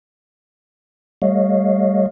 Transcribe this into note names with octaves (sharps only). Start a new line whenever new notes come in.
G3 A3 C#5 D#5 F5